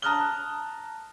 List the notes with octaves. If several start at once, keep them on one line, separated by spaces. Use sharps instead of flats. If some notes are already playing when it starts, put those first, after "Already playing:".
A5 A#5 D#6 F6 F#6 G7